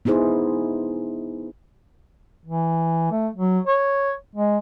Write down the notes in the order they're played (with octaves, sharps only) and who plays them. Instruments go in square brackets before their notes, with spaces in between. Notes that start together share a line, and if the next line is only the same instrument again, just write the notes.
[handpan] B3 D#4 E4 G#4 C5
[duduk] E3
A3
F#3
C#5
G#3